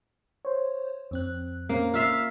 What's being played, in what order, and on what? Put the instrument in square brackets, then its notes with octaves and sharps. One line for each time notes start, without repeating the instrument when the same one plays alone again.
[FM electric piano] C5 C#5
F2 C4 F#6
[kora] A#3 [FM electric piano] C4 C#4
[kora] F4 E5 F5